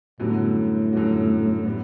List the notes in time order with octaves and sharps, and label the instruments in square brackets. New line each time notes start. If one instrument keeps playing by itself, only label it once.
[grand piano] F#2 D3 G3 B3 F#4 [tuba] A2
[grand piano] F#2 D3 G3 B3 F#4
G3 B3